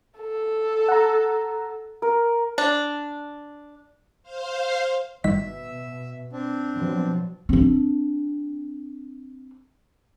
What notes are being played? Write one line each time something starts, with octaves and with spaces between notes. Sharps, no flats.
A4
F#5 A#5
A#4
D4
C5 F5
G1 B2 D#3 E5 E6 B6
C4 D4
B2 F3 F#3
C4 D4